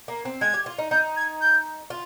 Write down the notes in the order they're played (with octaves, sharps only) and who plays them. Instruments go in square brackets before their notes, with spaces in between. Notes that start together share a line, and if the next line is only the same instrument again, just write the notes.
[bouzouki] A#3
C4
[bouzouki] G#3 [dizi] G#6
[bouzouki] G4
F4
D#4
[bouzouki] D#4 [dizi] G6
[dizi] G#6
G6
[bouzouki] F4